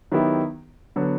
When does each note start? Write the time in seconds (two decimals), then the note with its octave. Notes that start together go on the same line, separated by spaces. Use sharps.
0.12 D#3 F#3 B3 E4 G4
0.96 D3 F#3 B3